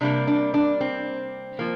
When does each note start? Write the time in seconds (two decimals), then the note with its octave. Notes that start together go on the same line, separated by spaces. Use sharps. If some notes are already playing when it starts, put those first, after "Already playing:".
0.01 C3 G3 A#3 D4
0.27 D4
0.54 D4
0.81 C4
1.59 F3 A#3